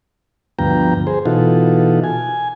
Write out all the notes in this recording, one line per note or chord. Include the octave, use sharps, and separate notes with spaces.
D2 G2 F3 B3 G5 A#5
G#4 C5
B2 E3 D#4 F4 F#4 A4
G#5